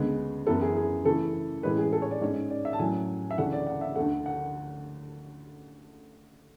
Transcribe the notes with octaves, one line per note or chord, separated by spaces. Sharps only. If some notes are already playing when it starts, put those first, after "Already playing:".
Already playing: D2 C#3 G#3 B3
F#2 E3 B3 E4 A4
G#4
G#4
C#3 E3 A3 E4 A4
A2 E3 G#3 C#4 B4
G#4
A4
C#5
D5
G#2 G#3 C#4
D5
E5
A5
A2 F#3 C#4 G#5
E5
D2 C#3 E3 A3 D4 F#5
D5
F#5
E5
D2 D3 A3 F#5
F#5